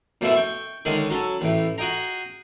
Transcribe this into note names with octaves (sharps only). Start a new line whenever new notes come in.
F#2 B2 A3 C#4 E4
G5 C#6
D3 D#3 G#3 C#4
F#3 C#4 A4
A1 A2
F#4 G#4 D#5 G5 A#5